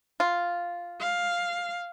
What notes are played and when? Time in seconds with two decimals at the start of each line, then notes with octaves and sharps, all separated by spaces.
0.20 F4
1.00 F5